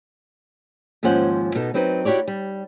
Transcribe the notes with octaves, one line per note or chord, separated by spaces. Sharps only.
D#2 G#2 F3 C#4 C5 F#5
B2 B3 D#4 A4
F#3 C4 D#4 B4
E4 F#4 G4 C#5 D5
G3